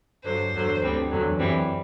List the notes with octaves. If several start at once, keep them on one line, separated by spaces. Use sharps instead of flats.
G2 D3 F#3 C5
E2 D3 F#3
D2 D3 G3 C4
E2 D3 F#3
F#2 E3 G3 C4